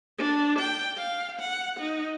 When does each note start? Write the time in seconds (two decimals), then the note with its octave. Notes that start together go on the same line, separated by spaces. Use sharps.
0.18 D4
0.59 G5
0.97 F5
1.40 F#5
1.80 D#4